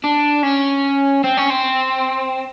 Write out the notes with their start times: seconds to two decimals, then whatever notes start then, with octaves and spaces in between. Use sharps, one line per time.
0.04 D4
0.43 C#4
1.24 C4
1.37 C#4
1.50 C4